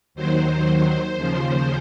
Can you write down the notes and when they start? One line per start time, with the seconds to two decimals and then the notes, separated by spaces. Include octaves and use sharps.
0.15 D#2 D#3 F#3 C5
1.17 D#2 C#3 F3